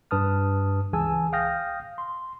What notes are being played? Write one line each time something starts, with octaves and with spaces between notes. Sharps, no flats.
G2 B4 A5 D#6 F6
C#2 E3 G#4 G#5 A5 E6
F5 G5 D#6 F6 G6 A#6
C6